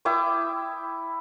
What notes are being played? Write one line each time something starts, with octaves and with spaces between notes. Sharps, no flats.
E4 G5 D6 D#6